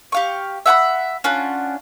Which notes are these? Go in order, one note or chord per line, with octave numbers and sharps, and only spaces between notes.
G4 F5 C#6
E5 F#5 G#5 B5
C#4 D4 F4 F#5